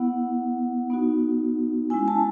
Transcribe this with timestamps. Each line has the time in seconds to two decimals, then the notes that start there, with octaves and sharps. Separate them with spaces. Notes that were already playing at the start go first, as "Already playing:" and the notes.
Already playing: B3 E4 F#5
0.90 B3 D#4 F#4
1.90 G#3 C#4 E4 G#5
2.08 A5